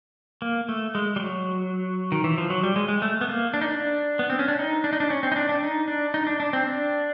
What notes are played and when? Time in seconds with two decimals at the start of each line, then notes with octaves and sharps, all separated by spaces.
0.42 A#3
0.69 A3
0.95 G#3
1.16 G3
1.20 F#3
2.12 D#3
2.24 E3
2.38 F3
2.50 F#3
2.64 G3
2.76 G#3
2.89 G#3
3.02 A3
3.21 B3
3.28 A#3
3.54 D4
3.61 D#4
3.68 D4
4.19 B3
4.30 C4
4.39 C#4
4.48 D4
4.59 D#4
4.84 D4
4.93 D#4
5.00 D4
5.10 C#4
5.23 C4
5.32 D#4
5.36 D4
5.49 D4
5.63 D#4
5.88 D4
6.14 D#4
6.27 D4
6.40 D4
6.53 C4
6.67 D4